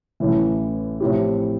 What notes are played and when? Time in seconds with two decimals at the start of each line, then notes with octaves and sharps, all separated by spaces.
0.20 A1 A2 E3
1.00 A2 F3 C4 E4 G4